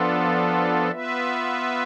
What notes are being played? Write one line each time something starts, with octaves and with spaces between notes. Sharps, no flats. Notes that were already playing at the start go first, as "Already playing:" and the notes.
Already playing: F3 B3 D4 F4 A4
B3 F4 B4 E5